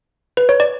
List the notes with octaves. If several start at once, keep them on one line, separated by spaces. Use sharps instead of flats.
B4
C#5
D5